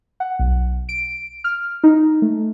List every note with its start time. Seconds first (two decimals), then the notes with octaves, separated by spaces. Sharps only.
0.20 F#5
0.39 B1
0.89 D7
1.44 F6
1.84 D#4
2.22 A3